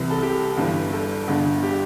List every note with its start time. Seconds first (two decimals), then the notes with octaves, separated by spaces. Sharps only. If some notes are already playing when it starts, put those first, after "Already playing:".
Already playing: C2 C3 E3
0.10 A4
0.22 G4
0.57 G1 G2 E3
0.92 A4
1.28 G1 G2 D3
1.63 G4